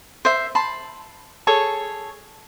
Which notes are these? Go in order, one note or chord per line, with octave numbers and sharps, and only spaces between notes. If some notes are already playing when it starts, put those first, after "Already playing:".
C5 E5
A5 B5 C6
G#4 A4 C#5